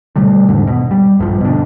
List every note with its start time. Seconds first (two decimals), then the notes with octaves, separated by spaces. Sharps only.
0.16 B2 D3 G3 A3
0.49 E2 G#2 D3
0.67 B2
0.91 G3
1.19 A#1 G2 D3 F3
1.41 B2 D3